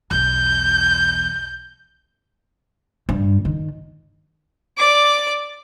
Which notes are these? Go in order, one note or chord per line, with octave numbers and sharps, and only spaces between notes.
B1 E2 G6
G2
D#3
D5 D6